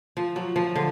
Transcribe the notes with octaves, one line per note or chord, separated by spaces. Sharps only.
F3
F#3
F3
D3